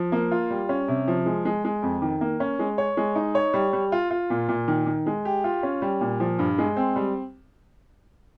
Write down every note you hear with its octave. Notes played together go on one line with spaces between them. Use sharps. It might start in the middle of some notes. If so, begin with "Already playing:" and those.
Already playing: F3
A#3
F4
G3
C#4
C3
F3
G#3
G#3
G#3
F2
D#3
A#3
C#4
G#3
C#5
G#3
D#4
C#5
G3
G3
F4
F4
A#2
A#2
D#3
D#3
G#3
G4
F4
C#4
G3
A#2
F3
G2
G#3
C4
G3